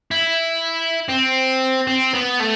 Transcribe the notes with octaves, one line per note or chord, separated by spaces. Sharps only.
E4
C4
C4
B3
A3